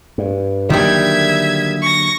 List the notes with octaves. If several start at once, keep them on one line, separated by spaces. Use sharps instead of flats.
G2
D3 D#3 F#3 G3 A#3 E5 G#6
C#6 A#6